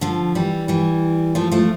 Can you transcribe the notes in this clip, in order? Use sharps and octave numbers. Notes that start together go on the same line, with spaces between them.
D3 F3
E3 G3
E3 G3
F3 A3
F3 A3